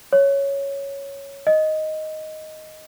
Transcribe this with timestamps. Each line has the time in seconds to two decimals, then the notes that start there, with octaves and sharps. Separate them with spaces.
0.13 C#5
1.47 D#5